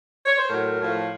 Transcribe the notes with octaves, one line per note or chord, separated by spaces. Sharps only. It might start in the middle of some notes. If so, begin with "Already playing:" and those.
C#5
C5
A2 F#3 A#4
A2 F3